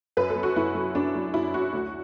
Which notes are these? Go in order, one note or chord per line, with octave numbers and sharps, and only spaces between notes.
F#2 B4
A4
F#3
F#4
F#2 E4
F#3
F#2 D4
F#3
F#2 E4
F#3 F#4
D2